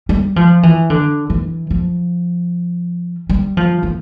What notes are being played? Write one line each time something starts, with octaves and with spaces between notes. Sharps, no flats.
G3
F3
E3
D3
E3
F3
G3
F3
E3